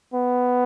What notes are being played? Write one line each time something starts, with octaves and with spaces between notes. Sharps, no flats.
B3